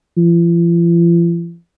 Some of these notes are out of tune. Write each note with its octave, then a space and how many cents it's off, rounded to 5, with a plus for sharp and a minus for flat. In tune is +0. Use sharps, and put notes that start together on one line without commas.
F3 -45